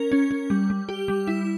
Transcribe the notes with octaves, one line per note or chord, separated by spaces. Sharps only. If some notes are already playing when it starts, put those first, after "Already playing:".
Already playing: C#4 A#4
C#4
C#4
G3
G3
G4
G3
E4